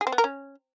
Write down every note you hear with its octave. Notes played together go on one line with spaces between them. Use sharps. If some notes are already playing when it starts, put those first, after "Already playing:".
G#4
C4
B3
A#4
C#4